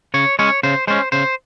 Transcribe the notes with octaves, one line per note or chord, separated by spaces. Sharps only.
C#3 C#5
G#3 C#4 C#5
C#3 C5
G#3 C#4 C5
C#3 C5